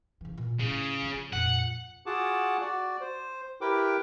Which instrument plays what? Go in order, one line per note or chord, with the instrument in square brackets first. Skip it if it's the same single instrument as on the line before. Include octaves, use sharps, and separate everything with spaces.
[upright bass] C#3 E3
A#2
[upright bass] A2 [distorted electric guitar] C#3
[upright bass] F3 F4
[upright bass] F2 A#2 [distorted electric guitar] F#5
[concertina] F4 F#4 G#4 F#5 A5 D6
F#4 D5
C5
E4 G4 A#4 B4 G5 D6